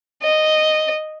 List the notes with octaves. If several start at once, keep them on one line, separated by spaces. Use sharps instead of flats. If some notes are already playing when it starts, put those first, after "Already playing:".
D#5